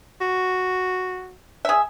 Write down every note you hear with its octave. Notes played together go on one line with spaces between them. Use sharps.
F#4
G#4 E5